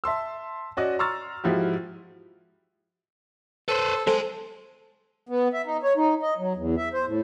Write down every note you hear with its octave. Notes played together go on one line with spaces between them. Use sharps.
E5 A5 C6 E6
C#4 F#4 D5 D#5
A#5 C6 C#6 E6 F6 A6
G#2 F3 E4 F#4 G4
A4 B4 C5
G#3 A4 C5 G#5
B3
E5
D#4
C#5
D#4
D#5
F#3
E2
E5
C5
A2